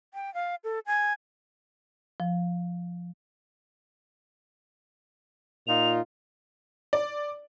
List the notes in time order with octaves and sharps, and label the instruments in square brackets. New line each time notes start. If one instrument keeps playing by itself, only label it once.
[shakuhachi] G5
F5
A4
G#5
[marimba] F3
[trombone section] A#2 D#4 F4 [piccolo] F7
[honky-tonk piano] D5